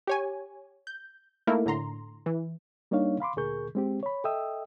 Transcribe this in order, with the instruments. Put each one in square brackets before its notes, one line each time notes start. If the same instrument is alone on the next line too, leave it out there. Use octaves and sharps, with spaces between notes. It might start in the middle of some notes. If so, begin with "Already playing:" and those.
[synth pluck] G4 C#5 G#5
G6
A3 A#3 D#4 E4 A#4
A2 D3 A#5 C6
E3
[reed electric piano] G3 A#3 D4 D#4 C#5 F5
F5 B5 C6 D6
D2 A#2 G#4 A#4 C#6 G6
G#3 C4 G4
C#5 B5
A4 D#5 E5 G5 D#6 E6